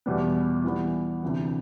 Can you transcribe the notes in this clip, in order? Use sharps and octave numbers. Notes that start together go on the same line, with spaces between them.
E2 B2 G3 B3
E3 G3 B3
D2 C3 E3